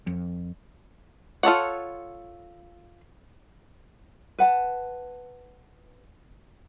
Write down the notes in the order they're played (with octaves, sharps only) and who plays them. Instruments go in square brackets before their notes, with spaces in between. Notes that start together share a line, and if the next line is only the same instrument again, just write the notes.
[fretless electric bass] F2
[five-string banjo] F4 A4 C#5 F#5
[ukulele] B4 F#5 A5